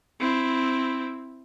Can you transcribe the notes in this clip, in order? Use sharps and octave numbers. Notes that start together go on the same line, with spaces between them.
C4 E4